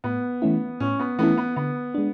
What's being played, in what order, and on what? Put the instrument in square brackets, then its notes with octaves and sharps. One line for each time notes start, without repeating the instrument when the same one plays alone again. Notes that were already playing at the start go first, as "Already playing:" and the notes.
[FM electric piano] A2 [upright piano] B3
[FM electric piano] E3 A3 C#4 E4
[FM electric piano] A2 [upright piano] C#4
[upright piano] B3
[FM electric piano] E3 A3 C#4 E4 [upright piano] B3
[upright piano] B3
[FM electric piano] D3 [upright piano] B3
[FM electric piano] G#3 D4